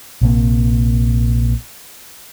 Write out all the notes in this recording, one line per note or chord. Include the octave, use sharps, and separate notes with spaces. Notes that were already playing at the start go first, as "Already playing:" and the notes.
A#1 C3 A#3